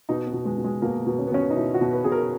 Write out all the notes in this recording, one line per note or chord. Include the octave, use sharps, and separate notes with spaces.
B2 D#4
B3
B2
G#3
B2
G#3
B2 A#3
B2
C#4
B3
B2 C#4
D#4
B2 E4
F#4
B2
B4
B2 G#4
A#4